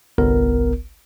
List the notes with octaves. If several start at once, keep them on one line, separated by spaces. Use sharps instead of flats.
G1 C2 B3 A#4